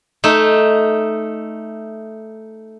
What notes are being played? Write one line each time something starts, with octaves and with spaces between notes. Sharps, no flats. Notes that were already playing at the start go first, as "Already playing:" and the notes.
A3 D#4